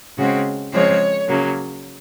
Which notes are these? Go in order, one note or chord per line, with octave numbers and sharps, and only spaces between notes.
C#3 G#3 C4 F#4
C#3 F3 G#3 C4 C#5
C#3 F#3 A#3